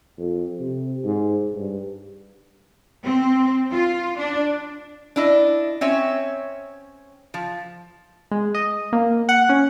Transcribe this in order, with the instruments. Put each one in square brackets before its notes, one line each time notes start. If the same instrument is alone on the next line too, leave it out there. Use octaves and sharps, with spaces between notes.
[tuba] F2
C3
G#2
G2
[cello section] C4
F4
D4
[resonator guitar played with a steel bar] D4 E4 D#5
C4 C#4 C#5 E5
F3
[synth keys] G#3
D#5
A#3
F#5
C#4